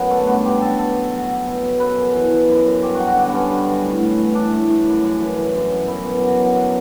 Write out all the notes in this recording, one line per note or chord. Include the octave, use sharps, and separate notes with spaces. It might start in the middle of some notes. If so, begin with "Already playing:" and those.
Already playing: F#2 F#3 B3
D3 A3
G2 B3
G2 G4
F#3 A4
B2 A4
B2
F#3
F#3
B2
B2
F#2 B4
F#2
E3
E3
F#2
F#2
G2 G4
F#3 F#4
F#4
D3
B3
G2 C#4
G2
F#3
A2
A2
E3
E3 D4
A2
A2
F#2
F#2
E3
E3
F#2
F#2
B2 E4
B2
F#3
F#3
B2